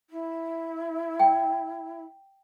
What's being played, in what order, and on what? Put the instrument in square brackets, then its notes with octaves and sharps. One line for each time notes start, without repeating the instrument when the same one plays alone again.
[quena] E4
[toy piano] G5